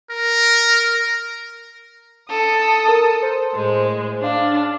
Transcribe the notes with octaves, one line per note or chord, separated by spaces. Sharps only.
A#4
A4 D#6
A#4
C5
A2 G#3
D4 F5